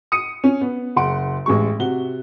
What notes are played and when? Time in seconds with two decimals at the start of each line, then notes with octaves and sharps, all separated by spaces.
0.12 D#6 C#7 D#7
0.44 C#4
0.61 B3
0.96 F#1 F#5 C6 D7
1.46 A1 G#3 C#6
1.79 C3 F#4 G7